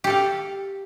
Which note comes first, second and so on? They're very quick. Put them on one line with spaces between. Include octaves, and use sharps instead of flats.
G4 A4 F5